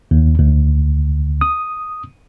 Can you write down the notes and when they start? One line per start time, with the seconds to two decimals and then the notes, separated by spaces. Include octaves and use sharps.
0.11 D#2
0.39 D2
1.41 D#6